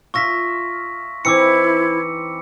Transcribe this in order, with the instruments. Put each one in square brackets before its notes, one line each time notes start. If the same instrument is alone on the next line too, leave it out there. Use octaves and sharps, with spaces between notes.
[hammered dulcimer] F4 E5 [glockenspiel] C#6 A#6 B6
[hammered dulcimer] E3 C4 D#4 [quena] E4 [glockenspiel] D6 E6 C#7